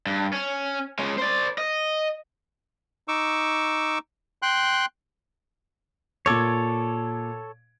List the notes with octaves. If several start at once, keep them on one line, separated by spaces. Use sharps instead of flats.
G2
C#4
G#3 C#4
C5 D5
D#5
D#4 C#6 D6 E6
G5 C6 F#6
A#2 A4 C#5 D6 G#6